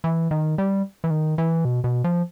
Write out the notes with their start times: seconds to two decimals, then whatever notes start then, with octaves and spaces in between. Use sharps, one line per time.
0.04 E3
0.31 D#3
0.58 G3
1.04 E3
1.10 D#3
1.38 E3
1.65 B2
1.84 B2
2.04 F3